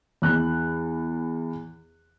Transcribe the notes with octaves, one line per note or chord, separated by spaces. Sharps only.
E2 F#6